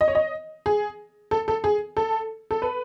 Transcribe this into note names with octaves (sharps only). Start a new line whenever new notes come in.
D#5
C#5
D#5
G#4
A4
A4
G#4
A4
A4
B4